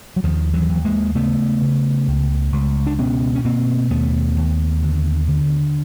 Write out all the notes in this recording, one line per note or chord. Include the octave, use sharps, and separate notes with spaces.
F#3
D#2 D#3 F3
E3 F#3
D#2
G#3 A#3
C#3 A3 B3
C#3
C#2
C#2
D4
B2 B3 C#4
C#4
B2 A#3 C4
D#2 A3 B3
D#2
D3
D3